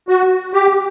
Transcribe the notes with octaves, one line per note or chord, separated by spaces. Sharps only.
F#4
G4